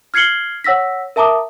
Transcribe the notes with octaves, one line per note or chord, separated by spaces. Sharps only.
F6 G#6 C7 C#7 F#7 G7
C#5 F#5 E6 A#6 B6
A#4 E5 A5 A#5 D6 D#6